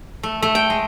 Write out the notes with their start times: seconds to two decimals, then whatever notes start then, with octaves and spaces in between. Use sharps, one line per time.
0.23 A3
0.42 A3
0.55 G5
0.70 G#3